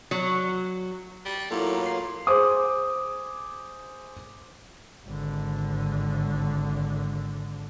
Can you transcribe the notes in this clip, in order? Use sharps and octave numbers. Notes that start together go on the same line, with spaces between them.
F#3
G3
A2 F#3 A#3 E4 F4 A4
C7
G#4 C5 D6 D#6
G#1 D3